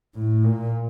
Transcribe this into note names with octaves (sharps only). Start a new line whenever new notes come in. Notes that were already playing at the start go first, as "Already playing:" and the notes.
A2
A#2